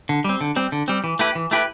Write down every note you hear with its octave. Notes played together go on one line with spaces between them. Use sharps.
D3
G3 C4
D3
G3 C4
D3
G3 C4
E3
A3 E4 G4 B4
E3
A3 E4 G4 B4